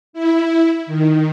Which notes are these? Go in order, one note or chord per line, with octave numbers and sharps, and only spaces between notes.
E4
D#3